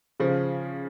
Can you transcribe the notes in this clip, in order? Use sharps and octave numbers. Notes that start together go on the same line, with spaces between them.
C#3 F3